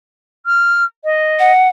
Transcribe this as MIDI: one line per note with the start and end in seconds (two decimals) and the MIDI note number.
0.46 0.84 89
1.04 1.52 75
1.39 1.68 78